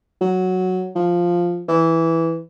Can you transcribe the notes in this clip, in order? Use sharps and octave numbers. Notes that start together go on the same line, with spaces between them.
F#3
F3
E3